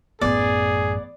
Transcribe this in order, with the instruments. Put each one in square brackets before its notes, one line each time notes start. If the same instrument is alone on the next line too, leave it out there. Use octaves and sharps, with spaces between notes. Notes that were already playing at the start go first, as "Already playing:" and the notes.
[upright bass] A1 F#2 [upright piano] B3 [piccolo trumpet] G#4 [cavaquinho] D5